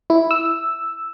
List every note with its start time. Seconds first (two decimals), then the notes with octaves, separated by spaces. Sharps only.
0.10 E4
0.31 E6